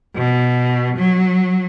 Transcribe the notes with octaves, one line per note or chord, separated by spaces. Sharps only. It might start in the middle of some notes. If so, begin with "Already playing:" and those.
B2
F#3